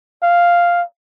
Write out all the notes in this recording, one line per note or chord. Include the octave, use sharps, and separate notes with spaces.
F5